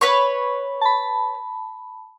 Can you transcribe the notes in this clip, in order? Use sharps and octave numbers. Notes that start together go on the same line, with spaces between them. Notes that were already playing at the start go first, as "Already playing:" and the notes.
B4 C#5 C#6
A5 B5